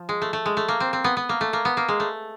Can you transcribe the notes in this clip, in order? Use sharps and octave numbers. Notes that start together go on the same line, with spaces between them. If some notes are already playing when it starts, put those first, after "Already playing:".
Already playing: F3
G#3
A3
A3
G#3
A3
A#3
C4
C4
B3
B3
A#3
A3
A#3
B3
A#3
G#3
A3